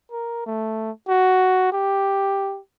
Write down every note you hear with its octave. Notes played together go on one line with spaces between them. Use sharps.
A#4
A3
F#4
G4